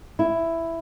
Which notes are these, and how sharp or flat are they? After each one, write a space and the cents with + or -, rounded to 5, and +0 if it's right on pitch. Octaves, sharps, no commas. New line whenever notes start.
E4 +5